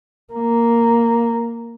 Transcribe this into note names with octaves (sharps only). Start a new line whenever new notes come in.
A#3